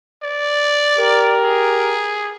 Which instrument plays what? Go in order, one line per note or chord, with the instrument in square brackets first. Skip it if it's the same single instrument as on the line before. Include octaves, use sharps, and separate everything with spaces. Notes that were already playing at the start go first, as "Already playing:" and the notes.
[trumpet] D5
[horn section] G4 A#4
[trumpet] G#4